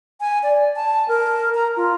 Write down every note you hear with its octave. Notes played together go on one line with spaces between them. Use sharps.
G#5
D5
A5
A#4
A#5
F4